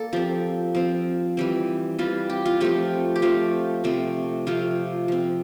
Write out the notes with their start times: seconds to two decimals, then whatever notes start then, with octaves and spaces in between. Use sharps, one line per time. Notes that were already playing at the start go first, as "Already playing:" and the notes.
Already playing: A#3 A4 D5
0.13 F3 C4 G4
0.75 F3 C4
1.37 E3 G3 C4
1.99 E3 G3 C4 F4
2.30 G4
2.46 F4
2.60 F3 A3 C4 G4
3.16 G4
3.22 F3 A3 C4 F4
3.84 C3 F3 A3 C4
4.47 C3 F3 A3 C4 F4
5.08 F3 C4